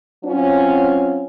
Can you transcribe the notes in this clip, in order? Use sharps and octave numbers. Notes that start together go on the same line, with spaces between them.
F#3 C4 C#4 F4